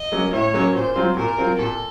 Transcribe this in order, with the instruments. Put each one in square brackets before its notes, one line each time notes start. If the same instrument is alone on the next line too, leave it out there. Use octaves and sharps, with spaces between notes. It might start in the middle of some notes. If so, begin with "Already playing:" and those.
Already playing: [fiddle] D#5
[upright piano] F#3 A#3 C#4
[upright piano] A2 [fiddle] C#5
[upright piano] F#3 A#3 C#4
[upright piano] A#2 [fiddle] C5
[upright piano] F#3 C4 F4
[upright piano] A#2 [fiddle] A#4
[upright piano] F#3 C4 F4
[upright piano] A#2 [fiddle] A4